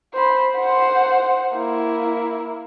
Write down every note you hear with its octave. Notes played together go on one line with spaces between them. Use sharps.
C5 B5
C5 F#5
A#3 E4